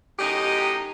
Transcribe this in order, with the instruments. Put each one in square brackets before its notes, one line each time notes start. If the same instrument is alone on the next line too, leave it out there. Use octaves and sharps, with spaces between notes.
[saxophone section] F#2 A2 D#4 G4 D#5